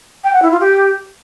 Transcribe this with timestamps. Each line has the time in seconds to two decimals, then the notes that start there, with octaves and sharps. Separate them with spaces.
0.23 G5
0.33 F#5
0.42 E4
0.51 F4
0.60 G4